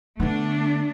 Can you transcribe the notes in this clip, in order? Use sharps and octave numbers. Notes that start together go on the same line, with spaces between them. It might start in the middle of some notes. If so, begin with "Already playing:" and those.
D3 A3 B3 D4